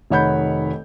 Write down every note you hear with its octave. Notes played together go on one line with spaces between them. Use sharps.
F1 D#3 C#5 F#5 B5 G6